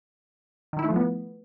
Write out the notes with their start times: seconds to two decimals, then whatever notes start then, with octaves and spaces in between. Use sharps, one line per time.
0.73 D#3
0.79 E4
0.85 A3
0.90 F3
0.96 B3